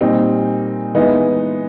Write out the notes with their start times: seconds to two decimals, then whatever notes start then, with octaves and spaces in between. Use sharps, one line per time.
0.01 A#2 G3 C4 D#4
0.95 E3 G#3 B3 D#4